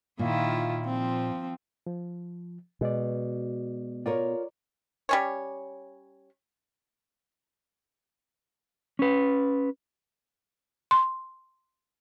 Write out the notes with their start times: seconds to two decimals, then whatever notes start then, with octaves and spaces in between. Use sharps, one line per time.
0.19 A#2 D#3 E4 F4
0.85 F3 C4
1.86 F3
2.81 B2 G#3 D5
4.06 F4 A#4 C#5 D5
5.09 G3 C#4 C#5
8.99 C#4 B4
10.91 C6